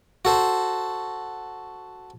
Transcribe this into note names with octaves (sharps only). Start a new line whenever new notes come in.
F#4 A4 C5